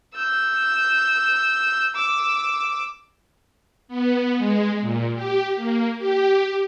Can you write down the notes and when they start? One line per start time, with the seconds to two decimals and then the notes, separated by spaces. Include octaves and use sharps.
0.15 E6 G6
1.95 D6 E6
3.88 B3
4.38 G#3
4.81 A#2
5.15 G4
5.56 A#3
5.99 G4